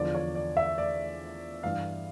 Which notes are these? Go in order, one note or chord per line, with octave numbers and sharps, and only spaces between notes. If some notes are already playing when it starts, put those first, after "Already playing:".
Already playing: E2 D3 F3 D5
C#5
D5
E5
D5
G2 E3 F5